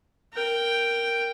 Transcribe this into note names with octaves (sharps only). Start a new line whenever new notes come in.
A#4 G5